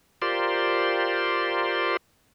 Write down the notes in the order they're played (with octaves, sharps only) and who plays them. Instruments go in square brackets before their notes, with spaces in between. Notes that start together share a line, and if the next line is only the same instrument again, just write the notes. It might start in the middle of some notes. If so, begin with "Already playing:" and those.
[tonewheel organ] F4 G4 A#4 C5 D5 C6